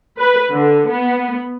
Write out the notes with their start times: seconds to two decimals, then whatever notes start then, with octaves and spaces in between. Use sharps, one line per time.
0.19 B4
0.52 D3
0.91 B3